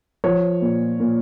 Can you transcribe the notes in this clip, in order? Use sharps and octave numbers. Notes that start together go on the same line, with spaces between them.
F3 C#5
A#2
A#2